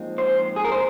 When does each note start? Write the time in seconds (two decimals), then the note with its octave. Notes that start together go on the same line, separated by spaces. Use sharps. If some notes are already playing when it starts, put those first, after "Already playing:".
Already playing: A#2 F3 G#3 C4 D#4
0.18 C5
0.56 G#4
0.65 A#4
0.72 C5